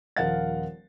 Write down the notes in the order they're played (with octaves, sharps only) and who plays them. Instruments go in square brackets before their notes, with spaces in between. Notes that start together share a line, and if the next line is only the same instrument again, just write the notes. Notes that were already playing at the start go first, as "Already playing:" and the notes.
[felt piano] D#1 F3 A#4 F5 F#5 A6